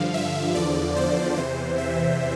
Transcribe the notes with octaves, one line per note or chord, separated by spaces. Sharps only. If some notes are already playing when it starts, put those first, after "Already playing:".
Already playing: G2 D3 F3 F5
E5
E2 D3 F3 D5
C5
E2 C3 E3 C5
E5